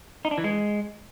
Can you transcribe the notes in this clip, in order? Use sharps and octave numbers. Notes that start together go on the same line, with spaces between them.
D#4
D4
E3
G#3